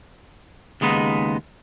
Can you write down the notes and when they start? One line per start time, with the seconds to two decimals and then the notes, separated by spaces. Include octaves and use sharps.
0.81 D#2 C#3 G#3 B3 D#4